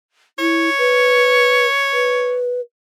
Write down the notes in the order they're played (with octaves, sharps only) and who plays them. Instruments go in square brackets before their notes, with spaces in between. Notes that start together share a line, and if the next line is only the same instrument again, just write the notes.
[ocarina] E4 [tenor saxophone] C#5
[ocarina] B4
B4